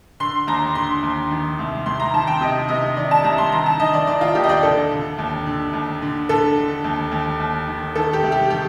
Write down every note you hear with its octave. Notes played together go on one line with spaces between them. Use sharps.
D3 C6
D#2 A#5
D3 C6
D#2
D#3
C2
C2 C6
A#5
D#3 A5
G5
C3 D#5
C3 D#5
D#3 D5
A5
C2 A#5
C6
D#3 A#5
A5
D#3 D#5
D5
D#3 D5
F4
D#2 G4
D#5
D5
D3 A4
D3
D#2
D3
D#2
D3
D3 A4
D3
D#2
D#2
D#2
D#3
D#3 A4
G4
C2
G4
D#3 G4